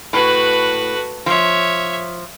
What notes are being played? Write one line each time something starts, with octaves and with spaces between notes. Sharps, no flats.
A2 F#4 B4
F3 C#5 E5